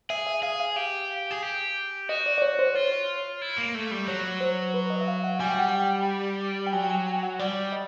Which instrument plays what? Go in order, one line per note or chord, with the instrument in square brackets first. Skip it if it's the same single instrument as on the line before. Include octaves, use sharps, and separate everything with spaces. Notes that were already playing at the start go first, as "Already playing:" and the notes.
[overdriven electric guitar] G#4 [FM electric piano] E5
[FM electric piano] E5
[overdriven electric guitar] G#4 [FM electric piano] F5
[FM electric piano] F5
[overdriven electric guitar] G4 [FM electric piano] F5
[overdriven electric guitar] G#4
G4
[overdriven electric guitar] F#4 [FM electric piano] D#5
[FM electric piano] D5
D5
C#5
C5
[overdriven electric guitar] F4 [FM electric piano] C#5
[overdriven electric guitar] E4
A#3
A3
G3
[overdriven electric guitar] F#3 [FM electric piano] C#5
[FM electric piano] C5
B4
D#5
E5
F5
F#5
[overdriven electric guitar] G3 [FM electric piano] G#5
[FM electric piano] G5
F#5
G5
G5
[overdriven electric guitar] F#3 [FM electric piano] G#5
[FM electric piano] G5
G#5
G5
F#5
[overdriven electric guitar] G3 [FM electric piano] D5
[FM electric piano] D#5